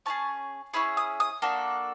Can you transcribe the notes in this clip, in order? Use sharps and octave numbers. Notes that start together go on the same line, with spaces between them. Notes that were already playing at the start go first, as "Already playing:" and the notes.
C#4 E4 G#4 A5
C#4 E4 G#4 B5
D#6
D#6
A#3 D4 F#4 A4